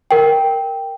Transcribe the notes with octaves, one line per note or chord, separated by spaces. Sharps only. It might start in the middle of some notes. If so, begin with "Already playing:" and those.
A#4 G5